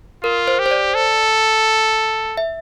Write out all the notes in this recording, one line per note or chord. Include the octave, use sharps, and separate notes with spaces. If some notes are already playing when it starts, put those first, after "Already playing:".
F4 A#4
C5
G4
C5
D5
A4
E5